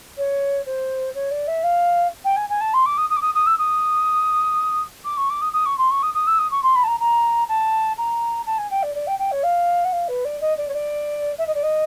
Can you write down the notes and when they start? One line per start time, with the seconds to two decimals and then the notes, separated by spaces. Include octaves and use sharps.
0.17 C#5
0.65 C5
1.14 C#5
1.30 D5
1.47 E5
1.63 F5
2.24 G5
2.36 G#5
2.49 G#5
2.60 A5
2.73 C6
2.85 D6
2.97 D#6
3.09 D#6
3.16 D6
3.21 D#6
3.34 D#6
3.46 E6
3.58 D#6
5.04 D6
5.17 C#6
5.29 D6
5.41 D#6
5.53 D#6
5.65 C#6
5.78 C6
5.90 C#6
6.02 D#6
6.14 D#6
6.27 E6
6.38 D#6
6.51 C#6
6.63 C6
6.75 B5
6.83 A5
6.87 A#5
7.00 A#5
7.48 A5
7.97 A#5
8.46 A5
8.58 G#5
8.70 G5
8.82 D5
8.95 D5
9.07 G5
9.18 G5
9.31 C#5
9.43 F5
9.84 F#5
9.92 F5
10.08 B4
10.24 D5
10.41 D#5
10.57 D5
10.68 C#5
10.73 D5
11.38 E5
11.47 D#5
11.54 D5
11.62 D#5